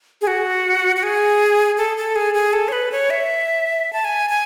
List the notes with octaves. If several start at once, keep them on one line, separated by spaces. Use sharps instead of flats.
G#4
F#4
F#4
G#4
A4
A4
G#4
G#4
A4
C#5
B4
C#5
E5
A5
G#5
G#5